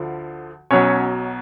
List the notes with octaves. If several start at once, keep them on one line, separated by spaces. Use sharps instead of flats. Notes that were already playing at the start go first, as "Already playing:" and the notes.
Already playing: D2 D3 F3
B1 B2 F#3 C#4 C#5